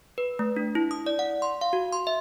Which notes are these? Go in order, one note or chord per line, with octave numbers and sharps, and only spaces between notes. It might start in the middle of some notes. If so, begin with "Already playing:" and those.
B4
A3
D4
E4
D#6
D5
F#5
C6
F5
F#4
C6
E5